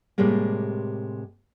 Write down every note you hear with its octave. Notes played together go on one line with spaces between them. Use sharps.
A2 C3 G3 G#3 A#3